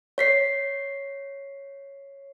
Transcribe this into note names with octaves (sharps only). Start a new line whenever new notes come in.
C#5 B6 C7